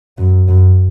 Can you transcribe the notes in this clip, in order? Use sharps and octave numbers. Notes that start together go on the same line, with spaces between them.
F#2
F#2